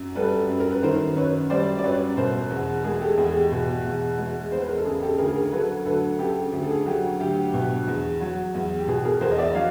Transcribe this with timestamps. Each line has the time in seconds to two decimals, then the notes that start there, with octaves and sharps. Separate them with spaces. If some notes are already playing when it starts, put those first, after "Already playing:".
Already playing: F#2
0.15 G3 A4 B4
0.49 F#2
0.60 A#4
0.71 B4
0.83 D#3 A#4 C5
1.16 F#2 B4 C#5
1.50 G3 C5 D5
1.79 D5
1.84 F#2 B4 C#5
2.17 B2 A#4 C5
2.50 E2
2.84 G#3 G#4 A#4
3.01 G4 A4
3.17 E2 G#4
3.35 G4
3.52 B2
3.85 E2
4.18 G#3
4.52 E2 C5
4.60 B4
4.69 A#4
4.77 A4
4.85 C#3 G#4
5.02 G4 A4
5.18 D2 G#4 A#4
5.35 G#4 A#4
5.52 F#3 A4 B4
5.85 D2 A4 B4
6.19 C#3 G4 A4
6.53 D2 G#4
6.62 A4
6.71 G#4
6.86 F#3 G4
7.20 D2 G4
7.53 B2
7.87 E2
8.21 F#3
8.54 E2
8.79 G4
8.87 B2 G#4
9.05 G#4 A#4
9.21 E2 A#4 C5
9.31 D#5
9.38 D5 E5
9.54 F#3 D#5 F5